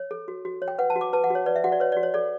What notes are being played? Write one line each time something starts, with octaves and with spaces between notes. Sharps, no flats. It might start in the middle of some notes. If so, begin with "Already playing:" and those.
Already playing: C#5
A4
F#4
F#4
C#5
G5
B4 F#5
A5
F#4
D6
B4 A5
F#5
F#4 C#5
B4 D5
E5
F#4 F#5
D5
B4 C#5
F#4 D5
C#5
A4 D5